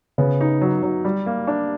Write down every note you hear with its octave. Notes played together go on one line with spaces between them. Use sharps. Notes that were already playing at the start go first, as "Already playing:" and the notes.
C#3 B3
D#4
F#3
F#3
G3
A#3
D4